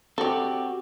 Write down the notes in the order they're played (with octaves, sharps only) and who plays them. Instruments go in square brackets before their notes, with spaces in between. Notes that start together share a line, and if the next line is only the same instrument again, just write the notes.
[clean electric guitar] C4 F#4 G4 [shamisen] A4 D5